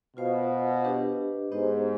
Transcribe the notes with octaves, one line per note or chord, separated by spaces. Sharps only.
B2 F4 C5 F5
D4 G4 B4 D#5
G#2 B3 D#4 G4 C5 D#5